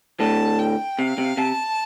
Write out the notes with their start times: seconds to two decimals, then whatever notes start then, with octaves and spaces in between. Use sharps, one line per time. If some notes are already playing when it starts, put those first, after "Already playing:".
0.20 A2 D3 A5
0.59 G5
0.99 C3 F5
1.18 C3
1.37 C3 A5